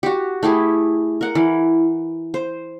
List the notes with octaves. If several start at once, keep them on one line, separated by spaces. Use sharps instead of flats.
F#4 G4
A3 E4 G4 G#4
A#4 F#5
E3
C5